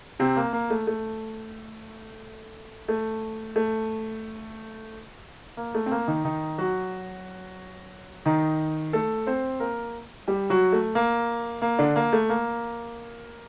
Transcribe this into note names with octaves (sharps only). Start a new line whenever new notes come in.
C3 C4
A#3
A#3
A3
A3
A3
A3
A#3
A3
C4
A#3
D#3 D#4
D#3 D#4
F#3 F#4
D#3 D#4
A3 A4
C4 C5
A#3 A#4
G3 G4
F#3 F#4
A3
A#3
A#3
D3 D4
A#3
A3
A#3